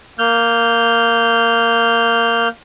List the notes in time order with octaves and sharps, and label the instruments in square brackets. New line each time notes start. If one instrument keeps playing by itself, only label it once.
[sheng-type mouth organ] A#3 F6 G6